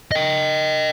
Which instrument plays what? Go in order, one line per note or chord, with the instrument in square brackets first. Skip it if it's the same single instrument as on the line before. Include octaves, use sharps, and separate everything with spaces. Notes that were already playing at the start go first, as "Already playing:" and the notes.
[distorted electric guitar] D#5 G5